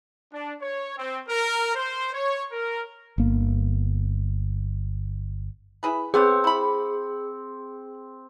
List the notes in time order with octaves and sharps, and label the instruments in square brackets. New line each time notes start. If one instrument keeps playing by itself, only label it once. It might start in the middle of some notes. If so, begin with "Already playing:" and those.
[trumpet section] D4
C#5
C4
A#4
C5
C#5
A#4
[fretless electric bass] G1 A#3
[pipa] E4 G#4 B4
[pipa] C3 B3 C#5 [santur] C4 [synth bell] G#4
[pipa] E4 B5